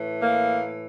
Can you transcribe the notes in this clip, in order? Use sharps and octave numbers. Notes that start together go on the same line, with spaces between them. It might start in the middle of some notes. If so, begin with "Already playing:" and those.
Already playing: A2 E3
A#3